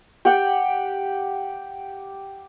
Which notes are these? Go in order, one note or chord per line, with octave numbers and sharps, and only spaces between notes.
G4 F#5 G5